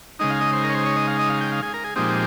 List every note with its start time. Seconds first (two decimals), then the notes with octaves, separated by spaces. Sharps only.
0.19 C#3 G#3 D#4 D#5
0.30 F5
0.41 D#5
0.53 C5
0.64 A#4
0.70 C#5
0.75 C5
0.86 C#5
0.96 D#5
1.07 F5
1.19 D#5
1.30 F5
1.41 G5
1.52 F5
1.63 G#4
1.74 A#4
1.84 G#4
1.96 A#2 F3 G#3 C4 D#4 G4